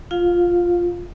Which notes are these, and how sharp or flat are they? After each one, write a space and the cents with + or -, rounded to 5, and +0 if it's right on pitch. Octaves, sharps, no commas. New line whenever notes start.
F4 +0 F5 +20